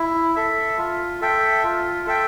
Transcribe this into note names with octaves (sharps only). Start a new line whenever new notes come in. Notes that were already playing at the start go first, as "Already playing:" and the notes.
Already playing: E4
A4 E5
F4
A4 E5 G5
F4
A4 E5 G5